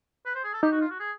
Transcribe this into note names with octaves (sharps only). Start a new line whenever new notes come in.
B4
C5
G#4
A4
D#4 G4
F#4
F4
F#4
G#4